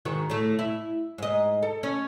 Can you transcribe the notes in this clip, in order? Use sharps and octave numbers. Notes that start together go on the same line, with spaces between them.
G#2 D#3 F#4
A2 A3
E4
G#2 D#5
A4
C#4